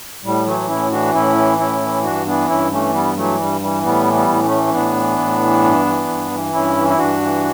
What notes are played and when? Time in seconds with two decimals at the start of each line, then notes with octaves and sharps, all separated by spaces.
0.23 A2 G3
0.46 E3 F#3 A3
0.68 A2 C#4 E4
0.91 E3 D4 F#4
1.13 A2 C#4 E4
1.36 E3
1.58 A2 C#4 E4
1.81 E3
2.03 G2 D4 F#4
2.26 E3 B3 D4
2.48 G2 C#4 E4
2.71 E3 A3 C#4
2.93 G2 G3 B3
3.16 E3 F#3 A3
3.38 G2 G3
3.61 E3 G3
3.83 A2 G3 B3
4.06 E3
4.13 G3 B3
4.28 A2
4.43 A3 C#4
4.51 E3
4.67 C#4
4.73 A2 B3 D4
4.96 E3
5.18 A2
5.40 E3
5.63 G2
5.86 E3
6.08 G2
6.31 E3
6.53 G2 C#4 E4
6.76 E3
6.88 E4
6.98 G2 D4 F#4
7.21 E3